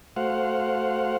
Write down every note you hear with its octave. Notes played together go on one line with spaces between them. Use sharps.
A3 F#4 C5 F5 F#5